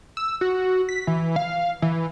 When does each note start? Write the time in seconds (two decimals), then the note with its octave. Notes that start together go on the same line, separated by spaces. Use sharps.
0.17 E6
0.41 F#4
0.89 B6
1.07 E3
1.36 F5
1.82 E3